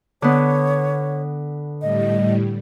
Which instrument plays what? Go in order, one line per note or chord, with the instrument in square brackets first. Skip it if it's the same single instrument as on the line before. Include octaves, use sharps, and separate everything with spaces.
[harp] D3 B3 [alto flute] C#5
[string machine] A2 G3 [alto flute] D#5